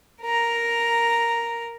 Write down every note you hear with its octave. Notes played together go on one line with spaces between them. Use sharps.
A#4 A#5